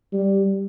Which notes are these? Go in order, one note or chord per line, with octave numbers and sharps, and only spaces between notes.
G3